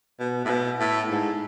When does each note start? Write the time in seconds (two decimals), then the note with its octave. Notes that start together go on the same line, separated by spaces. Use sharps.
0.20 B2
0.45 A2
0.50 B2
0.80 A2
1.09 G#2